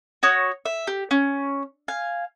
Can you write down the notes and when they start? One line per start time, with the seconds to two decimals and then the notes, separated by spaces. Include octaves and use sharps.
0.23 F#4 C#5 D#6
0.66 E5
0.87 G4
1.11 C#4
1.88 F5 G#5